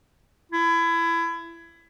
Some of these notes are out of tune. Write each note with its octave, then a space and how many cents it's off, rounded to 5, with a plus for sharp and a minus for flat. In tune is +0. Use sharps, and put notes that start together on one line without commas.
E4 +25